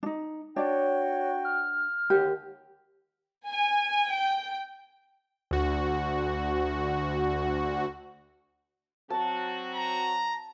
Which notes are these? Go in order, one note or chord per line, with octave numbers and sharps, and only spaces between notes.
D4 D#4
D4 F#4 C#5 D5 G5
F6
D#2 D3 G4
G#5
G5
D2 F#4
F#3 C4 F#4 A5
A#5